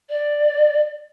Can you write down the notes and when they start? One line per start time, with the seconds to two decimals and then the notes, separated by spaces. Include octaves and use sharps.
0.10 D5